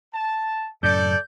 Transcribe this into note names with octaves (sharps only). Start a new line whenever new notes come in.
A5
F#2 A2 C#3 A4 D5 G6